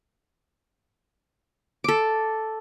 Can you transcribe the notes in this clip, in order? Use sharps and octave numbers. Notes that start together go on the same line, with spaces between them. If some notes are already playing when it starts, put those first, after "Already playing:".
A4 D6